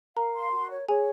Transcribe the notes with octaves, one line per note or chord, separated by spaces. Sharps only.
A#4 F5 A#5
C6
F#4
C#5
G#4 C#5 G#5